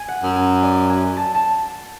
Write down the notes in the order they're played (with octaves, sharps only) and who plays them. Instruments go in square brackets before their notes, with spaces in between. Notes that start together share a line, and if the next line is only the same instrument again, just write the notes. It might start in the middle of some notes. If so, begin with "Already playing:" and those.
Already playing: [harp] G#5
F#5
[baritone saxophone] F#2
[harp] G#5
D5
G#5
A5
A5